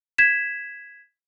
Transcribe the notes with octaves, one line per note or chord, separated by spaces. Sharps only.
G#6 B6 E7